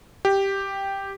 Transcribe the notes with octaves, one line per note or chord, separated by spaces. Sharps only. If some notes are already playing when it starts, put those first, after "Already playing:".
G4